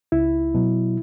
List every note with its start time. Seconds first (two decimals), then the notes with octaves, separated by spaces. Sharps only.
0.12 C#2 E4
0.55 B2 F#3